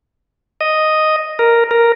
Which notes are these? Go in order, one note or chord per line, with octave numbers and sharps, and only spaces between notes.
D#5
A#4
A#4